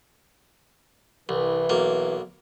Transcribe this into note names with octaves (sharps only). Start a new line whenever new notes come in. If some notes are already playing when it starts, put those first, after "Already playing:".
C2 E3
B1 A#3